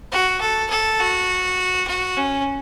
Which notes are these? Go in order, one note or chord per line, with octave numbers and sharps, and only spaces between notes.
F#4
A4
A4
F#4
F#4
C#4